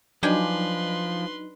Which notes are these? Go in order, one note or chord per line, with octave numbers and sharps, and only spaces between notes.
F3 F#3 D4 D#4 B4 G5 G#5 C6